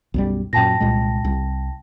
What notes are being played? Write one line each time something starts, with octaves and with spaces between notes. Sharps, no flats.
B1 F#2 G3
F#2 A#2 G5 A5 A#6
C2 A#2 G#3
C2